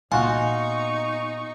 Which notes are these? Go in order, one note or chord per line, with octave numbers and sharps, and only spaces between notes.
A#2 B3 D#4 F4 F#4 G#5 C#6